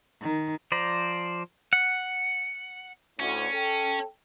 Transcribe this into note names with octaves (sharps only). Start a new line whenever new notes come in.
D#3
F3 C5 D5 A#5
F#5
D2 A2 C#4
A4 G5